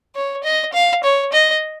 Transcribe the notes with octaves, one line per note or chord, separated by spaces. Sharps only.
C#5
D#5
F5
C#5
D#5